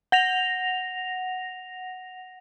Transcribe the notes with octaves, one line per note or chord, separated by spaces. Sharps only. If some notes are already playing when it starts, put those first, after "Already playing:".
F#5 A#6 F7